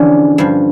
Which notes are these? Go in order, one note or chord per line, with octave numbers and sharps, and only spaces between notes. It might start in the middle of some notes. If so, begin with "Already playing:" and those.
Already playing: E2 D3 F3 C#4
G2 F3